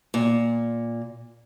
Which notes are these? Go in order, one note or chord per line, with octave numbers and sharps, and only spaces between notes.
A#2